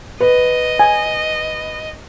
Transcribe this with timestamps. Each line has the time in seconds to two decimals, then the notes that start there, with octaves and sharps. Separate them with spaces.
0.20 B4 D#5
0.79 G#5